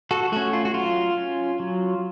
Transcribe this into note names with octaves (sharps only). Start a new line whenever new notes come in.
F#4 A4
A3 C#4 F#4
F4
F#4
F#3 F4
C#4
F#3